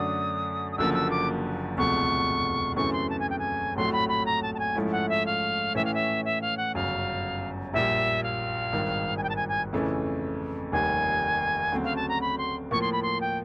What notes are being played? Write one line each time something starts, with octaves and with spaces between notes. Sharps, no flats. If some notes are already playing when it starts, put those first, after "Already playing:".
Already playing: F#2 D3 F#3 A3 D4 D#6
D#6
F#1 F#2 D3 F3 A#3 E6
E6
D6
E1 D2 C3 F3 A3 C#6
F#2 C#3 E3 A3 C4 C#6
C6
A5
G#5
G5
G#5
A#1 A2 F#3 A3 C4 C6
B5
B5
A#5
A5
A5
G#5
G#2 F3 A3 C#4 E4
F#5
E5
F5
A2 E3 A3 C#4 E5
F5
E5
E5
F5
F#5
G1 F#2 C#3 F5
A#1 A#2 G3 E5
F5
G#1 G2 D#3
G#5
G5
A5
G#5
G#5
F2 C#3 E3 A3
F1 D#2 D#3 G3 G#5
D2 C#3 F#3 A3 C4
F5
A5
A#5
B5
C6
A2 F3 A#3 C#6
C6
B5
C6
G5